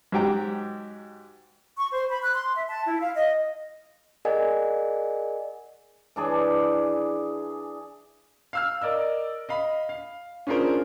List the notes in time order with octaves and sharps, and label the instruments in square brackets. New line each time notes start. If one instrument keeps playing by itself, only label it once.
[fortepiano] G#2 F#3 G4 G5 A#5
[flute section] C#6
C5
B5
F#6
C6
E5
A5
E4
F5
D#5
[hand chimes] G#4 A#4 D5 D#5 F#5 G#5
[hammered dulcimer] E3 D4 G#4 D5
[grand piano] F5 E6 F6
A#4 D5 D#5 E6
D#5 F5 B5
F5
C#4 D4 F4 G#4 A#4 C5